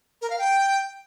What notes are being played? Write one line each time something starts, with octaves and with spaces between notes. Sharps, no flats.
A#4
F5
G5